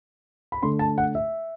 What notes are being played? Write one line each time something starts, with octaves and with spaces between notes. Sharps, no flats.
B5
D3 A3 C6
A5
F#5
E5